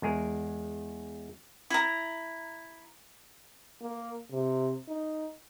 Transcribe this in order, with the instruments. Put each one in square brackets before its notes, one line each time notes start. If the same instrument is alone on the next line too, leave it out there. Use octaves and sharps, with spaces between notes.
[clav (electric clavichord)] E2 G#3 G#4 A#4
[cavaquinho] E4 A#5
[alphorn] A#3
C3
D#4